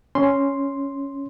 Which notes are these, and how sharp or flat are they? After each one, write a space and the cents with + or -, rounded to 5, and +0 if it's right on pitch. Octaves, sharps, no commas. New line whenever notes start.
C#4 +0 C6 +0